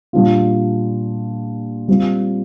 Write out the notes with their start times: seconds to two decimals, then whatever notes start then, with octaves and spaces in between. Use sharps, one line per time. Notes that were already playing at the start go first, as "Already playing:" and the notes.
0.13 A#2 G3 D4 F4
1.88 G3 C4 F4